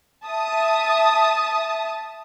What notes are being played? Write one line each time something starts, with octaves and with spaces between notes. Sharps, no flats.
E5 A5 D#6